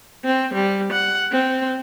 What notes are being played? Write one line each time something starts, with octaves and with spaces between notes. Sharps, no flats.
C4
G3
F#5
C4